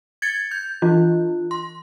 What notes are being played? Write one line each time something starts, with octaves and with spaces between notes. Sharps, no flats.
G#6 A6 C#7
G6
E3 F4
C6